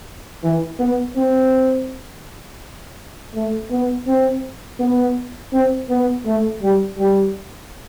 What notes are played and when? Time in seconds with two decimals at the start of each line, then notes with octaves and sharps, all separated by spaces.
0.44 E3
0.79 B3
1.16 C4
3.35 A3
3.71 B3
4.07 C4
4.80 B3
5.53 C4
5.89 B3
6.26 A3
6.62 G3
6.98 G3